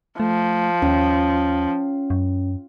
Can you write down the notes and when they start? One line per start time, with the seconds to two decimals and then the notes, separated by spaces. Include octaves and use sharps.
0.20 F3 A3
0.82 D#2 C#4
2.10 F#2